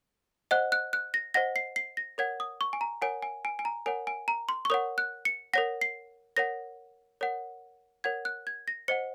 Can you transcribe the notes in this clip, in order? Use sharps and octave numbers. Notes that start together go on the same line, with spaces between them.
C5 D#5 F#5 F#6
F#6
F#6
A#6
C5 D#5 F#5 A#6
C7
C7
A#6
A#4 C#5 F#5 G#6
D#6
C#6
G#5
A#5
A#4 C#5 F#5 G#5
G#5
G#5
G#5
A#5
A#4 C#5 F#5 G#5
G#5
A#5
C6
C#6
A#4 C#5 F#5 D#6
F#6
C#7
A#4 C#5 F#5 A#6
C7
A#4 C#5 F#5 A#6
A#4 C#5 F#5
A#4 C#5 F#5 G#6
F#6
G#6
A#6
C5 D#5 F#5 C#7